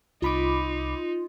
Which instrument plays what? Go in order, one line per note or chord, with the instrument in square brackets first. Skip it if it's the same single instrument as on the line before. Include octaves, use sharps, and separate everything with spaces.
[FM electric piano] C2 B5 D6 [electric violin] D#4 [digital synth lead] F4